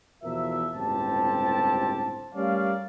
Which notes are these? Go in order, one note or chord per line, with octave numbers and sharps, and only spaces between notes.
E2 B2 F3 A#4 E5
G1 C#2 A2 C4 G4 A5
G3 A3 C#4 A#4 D5 F5